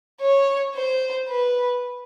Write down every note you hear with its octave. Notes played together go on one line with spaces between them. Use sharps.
C#5
C5
B4